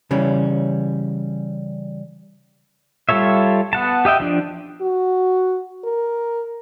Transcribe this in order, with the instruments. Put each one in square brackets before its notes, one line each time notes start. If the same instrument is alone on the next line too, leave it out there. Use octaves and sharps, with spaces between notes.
[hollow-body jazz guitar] C#3 E3 G3 C#4
[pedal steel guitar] G3 F4 A4 C#5 E5
B3 F#5 A5
G4 D#5 E5 G5
F3 D4
[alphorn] F#4
A#4